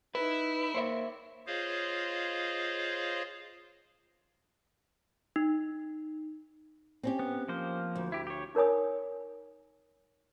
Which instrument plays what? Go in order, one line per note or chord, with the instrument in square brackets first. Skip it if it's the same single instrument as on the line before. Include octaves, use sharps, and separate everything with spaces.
[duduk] D#4 [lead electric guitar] E4 [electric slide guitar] B4
[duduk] A#3 [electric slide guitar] C5 C#5 E5
[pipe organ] F4 G#4 C5 C#5 D#5 F5
[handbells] D#4
[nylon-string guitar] C4 C#4 G4
[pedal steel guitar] B3
F3 A#3 C5
[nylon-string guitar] D2
[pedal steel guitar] E4 G4
G4 C#5
[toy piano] D#4 A#4 C#5 G#5 D#6